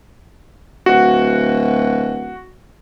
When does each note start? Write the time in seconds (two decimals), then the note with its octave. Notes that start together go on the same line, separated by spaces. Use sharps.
0.86 D1 F#4